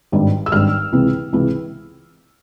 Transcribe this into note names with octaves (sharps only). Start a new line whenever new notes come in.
G#1 G2 D#3 G3
E6
G#1 G2 D#3 G3 F6
C#2 C3 E3
C#2 C3 E3